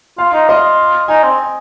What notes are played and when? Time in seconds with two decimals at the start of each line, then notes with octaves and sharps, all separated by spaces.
0.18 F4 F5
0.33 D#4
0.49 F4 D#5
1.08 D#4 G#5
1.23 C4